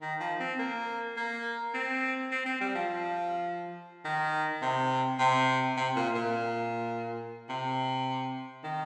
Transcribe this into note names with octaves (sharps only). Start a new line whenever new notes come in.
D#3
F3
C4
A#3
A#3
C4
C4
C4
G3
F3
D#3
C3
C3
C3
A#2
A#2
C3
D#3